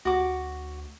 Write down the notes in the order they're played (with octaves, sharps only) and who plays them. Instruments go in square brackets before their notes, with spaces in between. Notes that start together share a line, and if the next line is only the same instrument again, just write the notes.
[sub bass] D2 [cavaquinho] F#4 D6